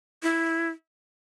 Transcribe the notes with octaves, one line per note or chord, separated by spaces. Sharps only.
E4